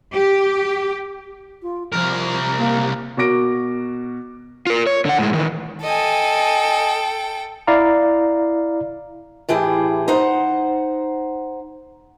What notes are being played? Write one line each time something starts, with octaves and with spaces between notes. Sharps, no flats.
G4
F4
C2 F3 A#4
A#3
B2 F#4 A#4 D6 A#6 D7
F4 A#4
C#5
D3 F#5
A2 G#3
D#3 E3
A4 D#5 G5 G#5
E4 D5 F5 A#5
A2 E3 G4 G#4
D#4 C5 F#5